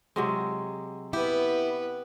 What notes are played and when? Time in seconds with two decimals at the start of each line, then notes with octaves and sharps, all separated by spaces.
0.16 C3 F#3 G#3
1.13 B3 E4 G4 B4